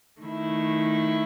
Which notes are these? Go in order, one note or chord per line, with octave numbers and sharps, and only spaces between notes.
D#3 A3 E4